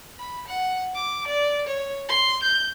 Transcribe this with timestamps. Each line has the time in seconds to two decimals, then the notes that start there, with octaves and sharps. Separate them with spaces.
0.19 B5
0.48 F#5
0.95 D6
1.27 D5
1.67 C#5
2.09 C6
2.43 G6